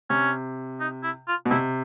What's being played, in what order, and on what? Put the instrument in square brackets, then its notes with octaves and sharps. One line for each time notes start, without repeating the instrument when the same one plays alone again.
[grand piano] C3 [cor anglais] C#4
[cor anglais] D#4
E4
F4
[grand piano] B2
[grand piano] C3 [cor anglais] E4